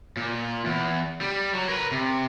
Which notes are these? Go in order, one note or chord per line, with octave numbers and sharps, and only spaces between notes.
A#2
E2
G3
F#3
A#4 B4
C3